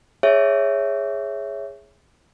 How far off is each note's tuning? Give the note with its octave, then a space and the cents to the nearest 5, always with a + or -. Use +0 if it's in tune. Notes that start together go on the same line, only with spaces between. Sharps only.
G#4 +0 C#5 +0 E5 +0